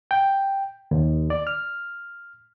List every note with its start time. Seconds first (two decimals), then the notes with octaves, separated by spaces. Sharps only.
0.11 G5
0.91 D#2
1.30 D5
1.47 F6